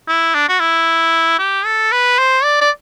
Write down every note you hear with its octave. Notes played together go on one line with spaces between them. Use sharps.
E4
D4
F#4
E4
G4
A4
B4
C5
D5
D5